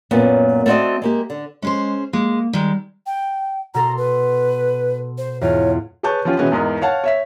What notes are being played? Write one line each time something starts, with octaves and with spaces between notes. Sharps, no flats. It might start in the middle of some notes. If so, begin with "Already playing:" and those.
F#2 A#2 A#3 B3 C#4
A3 B3 C4 F#4 D5 D#5
G#3 A#3 G4
D3
G#3 C#4 G#4 C5
G#3 A#3
D#3 G3 G#3
G5
B2 A4 A#5 C6
B4
C5
E2 G#2 F4 C#5
G#4 B4 C#5 A5 C#6 G6
F3 C#4 F4 G4
B2 E3 G#3 C#4 F#4 B4
E2 G#2 A#4 D#5
C#5 F5 F#5 A5
C#5 E5 B6